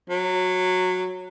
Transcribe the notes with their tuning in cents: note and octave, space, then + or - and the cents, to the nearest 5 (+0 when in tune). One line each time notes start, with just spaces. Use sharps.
F#3 -10